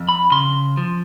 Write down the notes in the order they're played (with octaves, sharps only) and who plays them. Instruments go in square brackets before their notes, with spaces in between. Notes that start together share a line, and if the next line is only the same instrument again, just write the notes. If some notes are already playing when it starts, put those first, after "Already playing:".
Already playing: [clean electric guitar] F2
B5
C#3 C6
F3